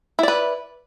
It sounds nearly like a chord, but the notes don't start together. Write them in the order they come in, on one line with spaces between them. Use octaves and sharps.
E4 D5 B4